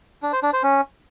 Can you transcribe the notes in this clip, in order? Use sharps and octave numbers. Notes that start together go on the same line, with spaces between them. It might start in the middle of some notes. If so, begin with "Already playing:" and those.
D4
C5
D4
C5
C#4